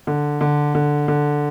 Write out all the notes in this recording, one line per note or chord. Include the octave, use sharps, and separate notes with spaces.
D3
D3
D3
D3